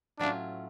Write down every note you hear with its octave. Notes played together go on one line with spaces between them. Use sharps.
A2 F#3 A3 C#4 D4 F4